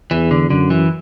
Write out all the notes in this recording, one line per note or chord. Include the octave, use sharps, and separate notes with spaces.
E2 E3
D3
F#2 D3
E3